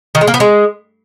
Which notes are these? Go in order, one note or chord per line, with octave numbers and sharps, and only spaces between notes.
D#3
G#3
A#3
B3
G#3